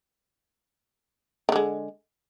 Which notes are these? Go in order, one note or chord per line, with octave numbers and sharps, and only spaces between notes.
D3 D#3 G#3